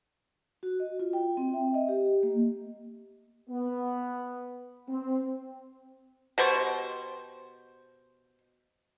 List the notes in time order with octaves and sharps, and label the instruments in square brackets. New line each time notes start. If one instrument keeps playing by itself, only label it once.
[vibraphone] F#4
D#5
F4
G5
C4
E5
D#5
G4
A#3
[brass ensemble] B3
C4
[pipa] B2 G4 C5 C#6